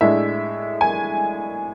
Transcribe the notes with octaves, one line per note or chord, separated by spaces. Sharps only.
A2 G#3 D4 E5
G#5